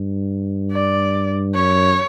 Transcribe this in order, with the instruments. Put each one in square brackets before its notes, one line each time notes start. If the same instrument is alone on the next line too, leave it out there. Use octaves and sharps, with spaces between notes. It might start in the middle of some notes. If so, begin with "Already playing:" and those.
Already playing: [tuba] G2
[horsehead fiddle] D5
[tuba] F#2 [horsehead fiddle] C#5